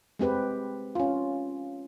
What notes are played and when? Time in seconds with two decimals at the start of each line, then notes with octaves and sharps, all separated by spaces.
0.19 G#3 C4 G4 B4
0.95 C#4 F4